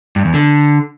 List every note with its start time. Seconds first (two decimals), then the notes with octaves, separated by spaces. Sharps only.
0.16 G2
0.25 E2
0.34 D3